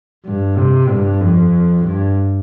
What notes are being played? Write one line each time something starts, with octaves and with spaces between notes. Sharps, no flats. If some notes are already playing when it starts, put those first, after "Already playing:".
G2
C3
G2
F2
G2